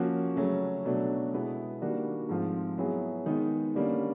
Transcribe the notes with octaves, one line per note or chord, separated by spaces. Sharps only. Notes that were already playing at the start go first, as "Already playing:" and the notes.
Already playing: F3 A#3 C#4 F#4
C#3 F#3 A3 C#4
B2 F#3 A3 D4
B2 G#3 B3 E4
D#3 G3 A#3 D4 F#4
G#2 F3 A3 C4 F4
F#3 B3 E4 G#4
D#3 G#3 B3 D#4
D3 G3 A#3 C#4